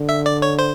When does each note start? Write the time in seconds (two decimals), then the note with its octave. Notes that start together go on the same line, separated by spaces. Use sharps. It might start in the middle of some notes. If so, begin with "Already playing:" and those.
Already playing: D3
0.09 E5
0.26 D5
0.42 C#5
0.59 C5